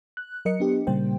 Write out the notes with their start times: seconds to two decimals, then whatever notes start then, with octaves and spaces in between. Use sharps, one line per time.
0.17 F#6
0.45 F#3 A#4 D#5 C#7
0.60 B3 D4 G4
0.87 A#2 C#3 G3 A#3 C5 G5